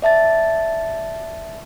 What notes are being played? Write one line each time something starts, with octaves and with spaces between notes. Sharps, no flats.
D5 E5 A5 A6